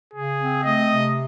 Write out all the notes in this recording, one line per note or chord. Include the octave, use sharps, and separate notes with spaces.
C#3 G#4
C4
A3 D#5
C3